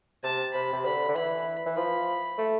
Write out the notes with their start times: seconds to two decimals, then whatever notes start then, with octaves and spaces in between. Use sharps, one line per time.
0.23 C3 A5
0.54 C3 B5
0.73 C3
0.85 D3 B5
1.08 D3
1.15 E3 B5
1.66 E3
1.77 F3 B5
2.38 A3